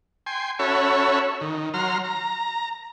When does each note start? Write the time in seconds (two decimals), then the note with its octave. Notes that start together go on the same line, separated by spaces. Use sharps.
0.26 G5 G#5 C6
0.59 C#4 F#4 A4 C#5 E5 B5
1.41 D#3
1.74 F#3 A#5 C6 F6
2.04 A#5